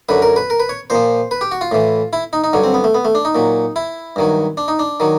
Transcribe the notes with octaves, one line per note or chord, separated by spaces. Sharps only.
F#2 D3 F#3 B4
A#4
B4
A#4
B4
C#5
A#2 F3 C5
B4
G4
F#4
F4
A2 E3
E4
D#4
D#4
G2 D3 F#3
C4
B3
A3
B3
A3
D4
D#4
A#2 F#3
E4
G2 D#3 F#3
D4
D#4
D4
D#3 F#3